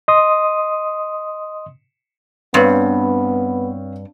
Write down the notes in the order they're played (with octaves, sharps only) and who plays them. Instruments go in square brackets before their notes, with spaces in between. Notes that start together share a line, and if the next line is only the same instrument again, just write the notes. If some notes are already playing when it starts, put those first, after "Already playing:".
[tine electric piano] D#5 C6 D#6
[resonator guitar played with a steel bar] G2 [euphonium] B3 [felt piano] C4 C#5 F5 [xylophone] B4 C6